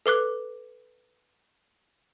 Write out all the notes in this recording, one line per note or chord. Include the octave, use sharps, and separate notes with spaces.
A4 B4 D6 F#6